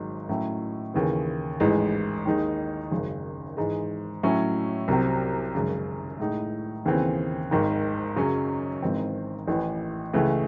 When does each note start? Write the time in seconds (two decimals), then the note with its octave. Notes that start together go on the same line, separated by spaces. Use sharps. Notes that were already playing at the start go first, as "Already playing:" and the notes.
Already playing: G#1 G#2 F#3
0.29 A2 F#3 C#4 E4
0.94 D#2 C#3 E3
1.60 A1 G#2 E3 G#3
2.25 D#2 D#3 G#3 D#4
2.92 G#1 F#2 C#3
3.57 G#2 E3 G#3
4.23 A2 F#3 C#4 E4
4.88 C2 C3 F#3 C4
5.54 G#1 F#2 C#3 G#3
6.19 A2 G#3 D#4
6.85 D#2 C#3 E3 C4
7.51 G#1 G#2 D#3
8.16 F#2 C#3 F#3 C#4
8.82 G#1 G#2 E3 C4
9.48 A1 A2 E3
10.13 C#2 C#3 E3 A3